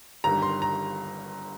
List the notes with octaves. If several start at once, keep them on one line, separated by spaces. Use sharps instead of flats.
G1 G2 D#3 G3 A#5
C6
A#5